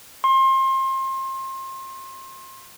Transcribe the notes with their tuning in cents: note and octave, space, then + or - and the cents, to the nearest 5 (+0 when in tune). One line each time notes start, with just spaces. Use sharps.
C6 +30